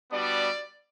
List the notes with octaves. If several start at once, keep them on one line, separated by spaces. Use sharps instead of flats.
G3 B3 D4 F#4 D5